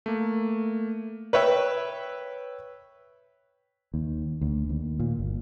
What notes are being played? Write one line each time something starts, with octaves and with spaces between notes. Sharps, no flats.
A3 A#3
B4 C#5 E5 G5
D#2
D2
D#2
A#2
G1